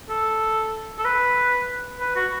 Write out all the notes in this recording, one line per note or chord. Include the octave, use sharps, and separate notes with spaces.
A4
A4
B4
B4
F#4